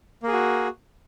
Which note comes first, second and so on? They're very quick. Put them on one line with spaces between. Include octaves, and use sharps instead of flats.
A#3 G#4 F#4